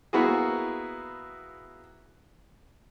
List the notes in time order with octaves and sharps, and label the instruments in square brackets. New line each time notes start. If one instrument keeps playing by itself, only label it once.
[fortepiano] A#3 B3 E4 F#4 G#4